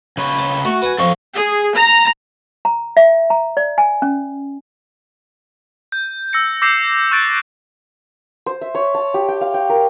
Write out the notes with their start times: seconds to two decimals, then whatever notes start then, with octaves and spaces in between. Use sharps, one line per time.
0.17 C#3 B4 C#5
0.38 A5
0.65 A3 F#4
0.82 B4 F#5 G#5
0.98 F2 A4 D#5 F5 C#6
1.34 G#4
1.75 A#5
2.65 A#5
2.97 E5
3.30 A#5
3.57 D5
3.78 G#5
4.02 C#4
5.92 G6
6.33 E6 A#6 C#7
6.62 D6 E6 G6 A#6 C7 E7
7.12 C#6 F#6 A6 D7
8.46 C5
8.61 E5
8.75 C#5
8.95 A5
9.14 G4
9.29 G5
9.41 F5
9.54 G5
9.69 A#4